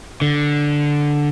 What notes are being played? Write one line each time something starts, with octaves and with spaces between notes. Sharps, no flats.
D3